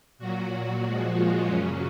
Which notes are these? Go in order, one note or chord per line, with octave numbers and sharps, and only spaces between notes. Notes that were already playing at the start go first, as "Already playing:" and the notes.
A#2 F#3 F#4
A#2 F3 G#3
F4
F#2 C#3 F#3 C#4